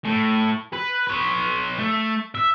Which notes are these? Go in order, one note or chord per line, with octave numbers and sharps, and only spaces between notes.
A2
B4
B4 C#5
A3
E5